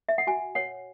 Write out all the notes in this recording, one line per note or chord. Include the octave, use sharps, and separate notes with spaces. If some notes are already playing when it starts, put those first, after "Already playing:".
E5
F#5
F#4 G#5
C#5 F#5